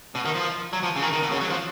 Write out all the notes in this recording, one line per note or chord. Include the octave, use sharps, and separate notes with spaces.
B2
D#3
F3
F#3
F3
C#3
D#3
D#3
B2
C#3
F#3
F3